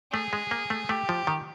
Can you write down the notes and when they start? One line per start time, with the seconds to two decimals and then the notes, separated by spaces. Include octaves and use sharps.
0.12 A3 G#4
0.33 G#3
0.51 A#3
0.70 A3
0.89 A3 G4
1.09 F3
1.27 D#3